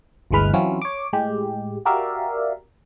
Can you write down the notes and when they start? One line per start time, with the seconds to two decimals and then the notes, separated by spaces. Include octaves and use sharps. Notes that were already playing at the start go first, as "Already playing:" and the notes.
0.31 G1 D2 E3 G#3 B4 F6
0.54 E3 F#3 C4 C#4 E4 F4
0.82 C#5 D6
1.13 A2 G#3 G4
1.85 F#4 G4 A#4 D5 E5 F5